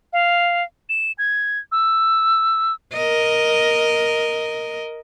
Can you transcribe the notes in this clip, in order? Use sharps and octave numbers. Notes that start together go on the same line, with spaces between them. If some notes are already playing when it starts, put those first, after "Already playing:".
F5
E7
G#6
E6
A#4 D#5